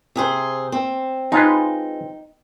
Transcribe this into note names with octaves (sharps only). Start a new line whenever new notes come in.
C3 G#4 C5
C4
G#3 D#4 F4 B4